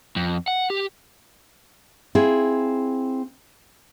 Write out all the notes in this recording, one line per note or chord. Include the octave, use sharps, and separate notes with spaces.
F2
F#5
G4
C4 E4 F4 G#4